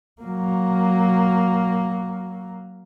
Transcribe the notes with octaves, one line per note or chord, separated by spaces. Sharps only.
F#3 A#3